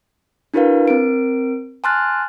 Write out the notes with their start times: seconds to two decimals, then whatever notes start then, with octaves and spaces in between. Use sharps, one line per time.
0.54 D4 E4 F#4 A#4 B4 F5
0.88 C4 A#4 D7
1.84 G#5 A5 C6 F6 F#6 A6